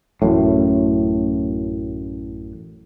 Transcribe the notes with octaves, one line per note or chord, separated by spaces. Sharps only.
A1 F#2 A2